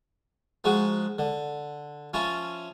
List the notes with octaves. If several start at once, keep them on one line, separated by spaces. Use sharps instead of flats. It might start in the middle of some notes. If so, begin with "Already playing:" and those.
F3 G#3 D#4 F#4
D3
F3 C#4 E4 F4